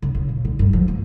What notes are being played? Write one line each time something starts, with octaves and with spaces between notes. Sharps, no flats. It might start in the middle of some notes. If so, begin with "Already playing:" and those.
C#3
C#3
A#2
D3
G2
F3
A#3